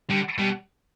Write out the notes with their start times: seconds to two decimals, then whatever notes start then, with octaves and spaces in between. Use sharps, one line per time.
0.10 D3 G3
0.39 B2 G3